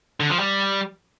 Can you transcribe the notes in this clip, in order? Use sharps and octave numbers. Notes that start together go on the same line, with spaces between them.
D3
F3
G3